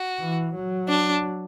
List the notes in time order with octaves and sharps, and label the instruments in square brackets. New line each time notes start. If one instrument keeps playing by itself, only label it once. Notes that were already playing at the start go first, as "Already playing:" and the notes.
Already playing: [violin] F#4
[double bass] E3
F#3
[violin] D4